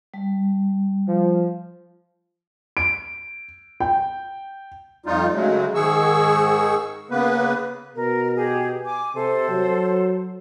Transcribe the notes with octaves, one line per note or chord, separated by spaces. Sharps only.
G3
F3
D7
G5
F2 G3 D#4 F4
C#3 F#3 G#3 A3
G#2 D#3 G#4 C#6 E6
C#3 A#3 B3 B4
B2 A#4
G4 G#4
G#5 D6
C3 A4 C5
F#3